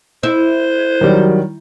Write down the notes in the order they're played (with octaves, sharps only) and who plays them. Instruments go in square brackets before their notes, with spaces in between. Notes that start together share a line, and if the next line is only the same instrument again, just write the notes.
[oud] E4 [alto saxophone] C5
[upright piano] D#3 G3 [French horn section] F#3